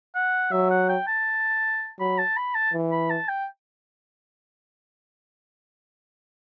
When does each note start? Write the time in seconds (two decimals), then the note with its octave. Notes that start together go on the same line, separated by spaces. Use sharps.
0.15 F#5
0.52 F#3 E5
0.70 F#5
0.89 G5
1.07 A5
1.99 F#3 B5
2.18 A5
2.36 B5
2.55 A5
2.73 E3
2.91 B5
3.10 A5
3.28 G5